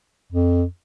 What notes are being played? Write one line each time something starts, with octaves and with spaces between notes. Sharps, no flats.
F2